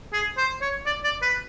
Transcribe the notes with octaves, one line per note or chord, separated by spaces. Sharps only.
G#4
C5
C#5
D5
D5
B4